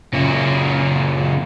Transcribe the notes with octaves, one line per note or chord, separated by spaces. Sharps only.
F#2 A#2 C#3 A#3